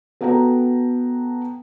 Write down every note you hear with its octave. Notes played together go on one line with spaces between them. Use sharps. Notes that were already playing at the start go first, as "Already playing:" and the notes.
B3 F#4 A4 F#5 G5 A#5